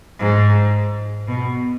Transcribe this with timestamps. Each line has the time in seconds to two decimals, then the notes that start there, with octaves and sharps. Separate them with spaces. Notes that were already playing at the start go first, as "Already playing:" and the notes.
0.19 G#2
1.28 B2